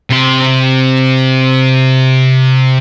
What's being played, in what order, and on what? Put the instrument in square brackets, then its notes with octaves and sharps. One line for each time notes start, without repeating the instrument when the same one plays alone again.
[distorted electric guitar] C3 C6